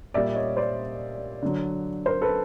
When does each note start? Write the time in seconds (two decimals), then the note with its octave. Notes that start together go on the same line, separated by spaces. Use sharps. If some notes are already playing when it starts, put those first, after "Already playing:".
0.14 A#2 G3 D5 E5
0.35 C#5 D#5
0.57 C5 D5
1.42 D3 F#3
2.06 A#4 C5
2.22 A4 B4